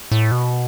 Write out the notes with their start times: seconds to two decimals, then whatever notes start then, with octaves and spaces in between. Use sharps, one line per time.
0.12 A2
0.32 B2